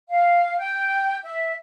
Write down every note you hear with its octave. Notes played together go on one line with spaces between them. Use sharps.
F5
G5
E5